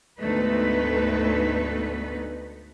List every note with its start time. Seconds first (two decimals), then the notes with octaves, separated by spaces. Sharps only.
0.21 D2 G#2 A3 B3 D#4 B4